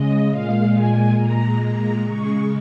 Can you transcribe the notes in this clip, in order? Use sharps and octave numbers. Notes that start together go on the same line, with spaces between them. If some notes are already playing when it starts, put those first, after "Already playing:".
Already playing: C#3 G#3 D#5
A#2 G#3 F5
G#5
A#2 G#3 A#5
A#5
C#3 G#3 C#6